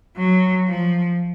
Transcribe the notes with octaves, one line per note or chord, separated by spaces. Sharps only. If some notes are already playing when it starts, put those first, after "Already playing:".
F#3
F3